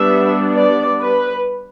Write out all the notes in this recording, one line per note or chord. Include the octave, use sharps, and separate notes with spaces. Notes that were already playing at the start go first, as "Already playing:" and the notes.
Already playing: G3 B3 D4 E5
D5
B4